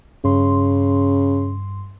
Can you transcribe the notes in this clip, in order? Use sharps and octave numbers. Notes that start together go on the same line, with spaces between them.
G2 C#3 C6